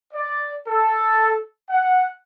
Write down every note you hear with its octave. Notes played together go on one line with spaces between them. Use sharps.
D5
A4
F#5